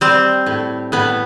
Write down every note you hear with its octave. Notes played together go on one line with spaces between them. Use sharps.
G3 C4
A2
A2 B3